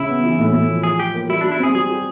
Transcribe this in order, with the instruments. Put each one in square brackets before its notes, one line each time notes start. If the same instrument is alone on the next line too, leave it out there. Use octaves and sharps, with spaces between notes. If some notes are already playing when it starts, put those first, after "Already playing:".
Already playing: [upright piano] C#3 [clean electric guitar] E4
[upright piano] B3
E3
A2
A2
F3
[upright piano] F3 [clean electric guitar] G#4
[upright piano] F4 [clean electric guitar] G4
[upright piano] A#3
[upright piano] G3 [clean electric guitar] E4
[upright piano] G3 [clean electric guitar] D4
[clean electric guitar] E4
[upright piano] C4 [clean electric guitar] G#4
[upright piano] G3 [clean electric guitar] G#4
[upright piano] G4